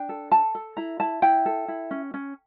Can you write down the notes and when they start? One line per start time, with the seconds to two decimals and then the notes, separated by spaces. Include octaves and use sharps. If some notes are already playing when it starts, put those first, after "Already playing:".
Already playing: D4 G5
0.09 A4
0.31 A4 A5
0.55 A4
0.77 E4 A#5
1.00 E4 A5
1.22 E4 G5
1.46 A4
1.68 E4
1.91 C#4
2.14 C#4